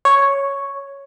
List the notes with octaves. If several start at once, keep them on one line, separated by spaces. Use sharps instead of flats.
C#5